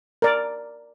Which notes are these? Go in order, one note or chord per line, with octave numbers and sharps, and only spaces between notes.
A#4 D5